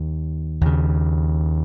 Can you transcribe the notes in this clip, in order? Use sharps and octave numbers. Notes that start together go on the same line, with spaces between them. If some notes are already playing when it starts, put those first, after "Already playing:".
Already playing: D#2
D#2 C#3